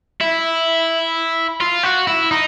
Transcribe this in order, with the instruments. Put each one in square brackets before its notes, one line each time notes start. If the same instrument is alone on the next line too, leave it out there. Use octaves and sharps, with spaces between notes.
[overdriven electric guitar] E4
F4
F#4
E4
D#4